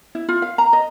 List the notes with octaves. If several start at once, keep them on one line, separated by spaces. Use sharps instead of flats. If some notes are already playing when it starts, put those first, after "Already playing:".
E4
F4
F5
A#5
D#5